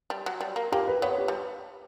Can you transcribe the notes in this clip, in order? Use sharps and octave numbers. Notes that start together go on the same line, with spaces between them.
G3
F#3
G3
A#3
A#3 G4
B4
B3 C#5
G4
G3